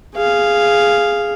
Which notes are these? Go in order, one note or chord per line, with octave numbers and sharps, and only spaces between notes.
G#4 F5